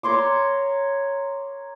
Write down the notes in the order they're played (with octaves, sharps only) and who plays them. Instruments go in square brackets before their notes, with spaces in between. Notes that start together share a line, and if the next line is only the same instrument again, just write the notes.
[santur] A#4 C#5 C6 D6